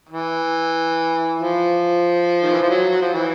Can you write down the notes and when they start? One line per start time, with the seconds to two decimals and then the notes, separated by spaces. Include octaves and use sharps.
0.09 E3
1.40 F3
2.43 D#3
2.51 E3
2.62 F3
2.70 F#3
2.90 F#3
3.02 F3
3.14 E3